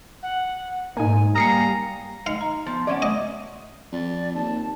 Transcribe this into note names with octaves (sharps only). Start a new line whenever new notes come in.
F#5
G#2 A#3 D#4 G#5
G3 A#3 G#5 A#5 D#6 C7 C#7
D#4 D#5 F5
A#5
F3 B3
C#4 C#5 D5 E5 F#5
D#5
F2 D5
D#2 A5